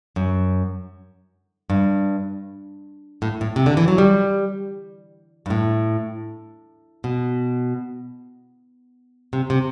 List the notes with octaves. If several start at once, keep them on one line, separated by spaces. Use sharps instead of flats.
F#2
G2
A2
A2
C3
D3
E3
F#3
G3
G2
A2
B2
C3
C3